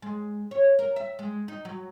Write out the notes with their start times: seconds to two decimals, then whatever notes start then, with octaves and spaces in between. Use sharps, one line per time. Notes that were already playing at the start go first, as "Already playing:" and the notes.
0.02 G#3
0.51 C#5
0.79 A#4
0.96 E5
1.19 G#3
1.48 D#4
1.65 F#3